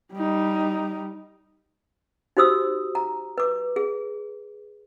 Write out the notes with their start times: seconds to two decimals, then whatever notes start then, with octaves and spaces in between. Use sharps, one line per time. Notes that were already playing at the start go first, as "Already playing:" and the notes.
0.14 G3 D#4
2.37 D#4 F#4 G4 C5 D#6 E6
2.95 A#5
3.38 B4 D6
3.76 G#4